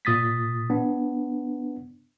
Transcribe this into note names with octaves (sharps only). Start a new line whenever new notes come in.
A#2 D#6 A6 B6
B3 D4